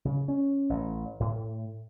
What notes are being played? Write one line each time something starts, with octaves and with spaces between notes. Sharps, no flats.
C#3
C#4
A1
A2